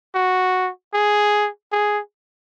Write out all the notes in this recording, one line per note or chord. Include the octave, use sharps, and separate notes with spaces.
F#4
G#4
G#4